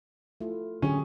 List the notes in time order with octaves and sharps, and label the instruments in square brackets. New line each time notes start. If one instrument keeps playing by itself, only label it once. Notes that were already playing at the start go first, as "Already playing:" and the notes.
[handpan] A3 E4 F4
[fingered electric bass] D3 D4 [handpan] F#3 G4 G#4 [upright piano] C#4